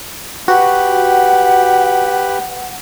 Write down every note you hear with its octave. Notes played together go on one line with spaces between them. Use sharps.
F#4 G4 B4 F#5